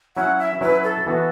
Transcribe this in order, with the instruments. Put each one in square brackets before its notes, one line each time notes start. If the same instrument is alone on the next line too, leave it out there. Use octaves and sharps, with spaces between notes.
[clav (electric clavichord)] F#3 C#4 E4 [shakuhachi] F#5
[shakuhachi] E5
[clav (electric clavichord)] F#3 C#4 E4 [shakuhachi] B4
[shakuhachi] A4
[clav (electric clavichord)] E3 B3 F#4